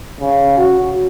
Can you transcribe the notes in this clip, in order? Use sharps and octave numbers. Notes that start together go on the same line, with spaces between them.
C#3
F#4